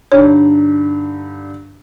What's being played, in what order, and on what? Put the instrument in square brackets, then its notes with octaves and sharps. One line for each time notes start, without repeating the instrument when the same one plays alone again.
[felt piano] G2 D3 D#4 [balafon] C#5